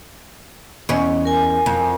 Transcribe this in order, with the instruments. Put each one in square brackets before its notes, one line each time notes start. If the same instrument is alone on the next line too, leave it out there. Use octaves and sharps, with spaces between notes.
[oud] E2 C#4 [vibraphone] D#5
[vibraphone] A#4 G#5
[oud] F2